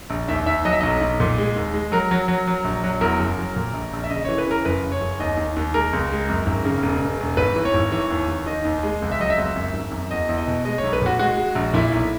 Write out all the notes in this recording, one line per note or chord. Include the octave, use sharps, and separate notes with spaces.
A#1
D#2 E5
D#2 E5
F#3 D#5
E5
B1 D#5
B1
A#2
G#3
D#2
G#3
F#3 A#4
F#3
F#3
F#3
A#1
F#3
E2 A#4
F#1
F#3
A#2
A#1
A#1
E5
C#3 D#5
E3 C#5
B4
C#3 A#4
F#1 B4
F#1
C#5
F#1
D#2 D#5
D#2
D#2
G#3 A#4
C#2
G#3
F#2
G#1
C#3
E1
E1
E1
G#1 B4
E3
C#5
G#1
E3 C#5
D#2
D#2
D#3 D#5
D#2
G#3
C#2
E5
F#3 D#5
E5
C#2
F#2
G#1
F#2
E2 D#5
E2
D#5
B2
G#3 D#5
C#5
B1
B4
A#2 F#4
G#3 F#4
G#3
A#1
A#2 E4
B1